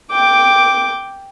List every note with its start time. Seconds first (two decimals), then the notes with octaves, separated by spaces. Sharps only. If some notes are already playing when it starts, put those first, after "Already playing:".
0.11 G5 D6